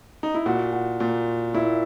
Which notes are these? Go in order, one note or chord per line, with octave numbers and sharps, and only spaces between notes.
D#4
E4
A#2 F#4
F#4
A#2
A#2 E4